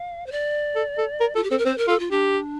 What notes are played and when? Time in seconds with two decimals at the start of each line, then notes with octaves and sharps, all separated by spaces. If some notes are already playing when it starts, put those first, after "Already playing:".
Already playing: F5
0.26 C5
0.32 D5
0.76 A4
0.98 A4
1.20 A#4
1.35 F4 A4
1.43 G4
1.50 C4 A4
1.58 A#4
1.65 C4 C5
1.78 A#4
1.88 F4 A4
1.99 F4
2.11 D4 G4